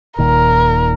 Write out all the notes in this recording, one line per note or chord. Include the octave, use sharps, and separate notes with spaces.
D#1 A#2 D#3 A#4